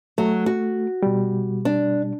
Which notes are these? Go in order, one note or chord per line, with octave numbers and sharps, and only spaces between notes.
F#3 A3
F#4
B2 G3
D4